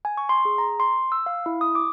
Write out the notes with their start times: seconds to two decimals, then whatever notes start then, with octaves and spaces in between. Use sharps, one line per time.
0.05 G#5
0.17 C#6
0.29 C6
0.45 G#4
0.58 A#5
0.80 C6
1.12 E6
1.26 F5
1.46 E4
1.61 D#6
1.75 D6